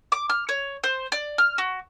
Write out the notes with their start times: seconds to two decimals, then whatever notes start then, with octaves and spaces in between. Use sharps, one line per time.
0.12 D6
0.30 F6
0.49 C#5
0.84 C5
1.12 D5
1.38 F6
1.58 F#4